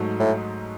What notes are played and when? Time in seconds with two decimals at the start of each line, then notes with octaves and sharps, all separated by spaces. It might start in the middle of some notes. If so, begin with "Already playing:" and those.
Already playing: G#2 F#3 A3 D#4
0.20 A2